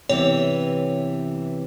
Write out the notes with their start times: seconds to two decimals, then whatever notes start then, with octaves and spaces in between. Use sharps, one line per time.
0.09 C3 E3 B3 C#5